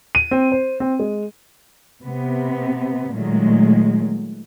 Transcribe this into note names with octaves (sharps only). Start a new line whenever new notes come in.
D#7
C4
C5
C4
G#3
C3 B3
A#2 D#3 F#3 G#3 A3